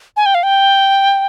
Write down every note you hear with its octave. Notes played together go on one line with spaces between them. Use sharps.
G#5
G5
F5
G5